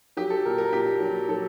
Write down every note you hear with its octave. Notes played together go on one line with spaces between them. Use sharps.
F#3 G4
A4
A#2 A#4
A#4
A#2 G4
F#3
F#3 A4